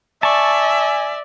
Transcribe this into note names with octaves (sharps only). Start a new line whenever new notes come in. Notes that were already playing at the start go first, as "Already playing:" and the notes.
D5 E5 G#5 A5 C#6